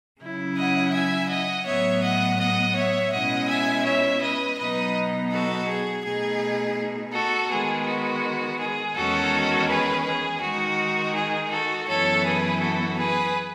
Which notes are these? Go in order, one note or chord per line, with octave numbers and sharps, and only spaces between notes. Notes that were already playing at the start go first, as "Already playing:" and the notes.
C#3 F#3 C#4 E4
D#5 F#5
E5 G#5
D#5 F#5
A2 F#3 B3 C#5 E5
D#5 F#5
D#5 F#5
C#5 E5
B2 G#3 C#4 E4 D#5 F#5
E5 G#5
C#5 E5
B4 D#5
B2 F#3 B3 D#4 B4 D#5
F#4 A4
G#4
B2 A3 D#4 G#4
F#4 A4
D#3 G#3 B3 G#4
F#4
G#4
E2 D#3 G#3 C#4 F#4 A4
G#4 B4
G#4
D#3 G#3 D#4 F#4
G#4
F#4 A4
F#2 E3 B3 E4 A4 C#5
G#4 B4
F#4 A4
G#4 B4